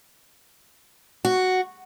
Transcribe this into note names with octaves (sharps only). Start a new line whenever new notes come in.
F#4